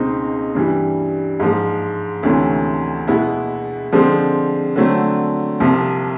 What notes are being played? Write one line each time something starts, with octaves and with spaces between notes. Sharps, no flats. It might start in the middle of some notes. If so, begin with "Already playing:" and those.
Already playing: C#2 B2 G#3 C4 D#4
G2 E3 G3
G#2 F3 G#3
D2 C3 E3 A3 C#4
B2 G#3 B3 E4
D3 F3 G#3 C4
D3 F#3 A3 C4
C2 C3 F3